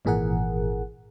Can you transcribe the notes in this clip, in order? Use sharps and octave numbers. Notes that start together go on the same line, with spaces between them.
G#1 A#2 E3 G#4 A#4 F#5